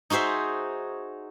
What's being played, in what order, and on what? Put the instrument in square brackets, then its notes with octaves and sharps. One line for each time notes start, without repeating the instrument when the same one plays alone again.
[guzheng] D#4 F#4 G#4 C5 E5